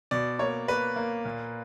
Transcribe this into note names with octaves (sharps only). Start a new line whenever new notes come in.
B2 D5
A#3 C#5
A#3 B4
A#3
A#2